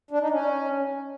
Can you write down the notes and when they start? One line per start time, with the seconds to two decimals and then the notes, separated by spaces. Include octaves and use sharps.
0.11 D4
0.21 D#4
0.31 C#4